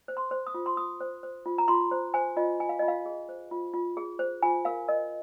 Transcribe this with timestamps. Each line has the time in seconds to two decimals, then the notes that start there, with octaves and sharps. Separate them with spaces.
0.08 C5
0.17 C6
0.31 C5
0.47 D#6
0.54 F4
0.66 C6
0.77 F4 D#6
1.00 C5
1.23 C5
1.46 F4
1.58 A#5
1.68 F4 C6
1.91 C5
2.14 C5 G#5
2.37 F4 D#5
2.60 F4 G#5
2.69 F5
2.79 F4 D#5
2.88 F5
3.06 G#4
3.29 C5
3.51 F4
3.73 F4
3.97 G#4
4.19 C5
4.43 F4 G#5
4.65 A#4 F5
4.88 A#4 D#5